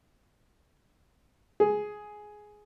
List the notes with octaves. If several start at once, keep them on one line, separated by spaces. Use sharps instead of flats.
G#4